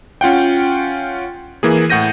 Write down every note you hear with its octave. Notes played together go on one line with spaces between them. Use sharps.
C#4 F4 F#5 G5
E3 A#3 G#4
A2 F#5 G6 A#6 D#7